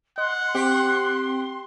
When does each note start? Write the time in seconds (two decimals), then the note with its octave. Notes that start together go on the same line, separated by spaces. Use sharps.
0.18 D#5 F#5 C6
0.55 C4 G4